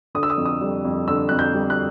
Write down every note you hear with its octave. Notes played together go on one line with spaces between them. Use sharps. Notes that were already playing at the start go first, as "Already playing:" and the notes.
D3 D#6
E6
D#6
F2
D#6
G3
F2
D3 E6
F2 F#6
G6
G3
F#6